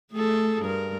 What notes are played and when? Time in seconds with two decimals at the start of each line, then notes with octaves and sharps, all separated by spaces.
0.12 A3 G#4 A4
0.62 G2 A#4